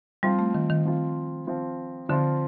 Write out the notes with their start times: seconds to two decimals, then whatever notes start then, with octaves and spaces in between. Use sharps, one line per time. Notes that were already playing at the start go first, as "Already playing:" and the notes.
0.23 F3 G3 C4 F4
0.39 A3
0.54 D#3
0.70 D#3
0.85 F3 C4 F4
1.47 F3 C4 F4
2.09 D3 F3 C4 F4